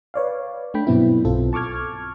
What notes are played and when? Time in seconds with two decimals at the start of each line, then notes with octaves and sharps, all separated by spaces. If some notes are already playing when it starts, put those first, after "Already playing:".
0.14 B4 C#5 D5 F5
0.74 A3 D4 G5 B5
0.87 G2 B2 F#3 B3 C4 E4
1.25 B1 C4 F4 A4
1.53 A5 C#6 D6 F6 G#6